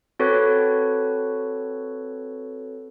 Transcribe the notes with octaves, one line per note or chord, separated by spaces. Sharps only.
C4 F#4 A4 B4 C#5